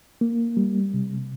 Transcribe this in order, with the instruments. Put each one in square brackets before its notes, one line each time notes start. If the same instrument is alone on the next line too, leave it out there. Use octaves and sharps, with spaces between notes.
[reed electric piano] A#3
G3
C3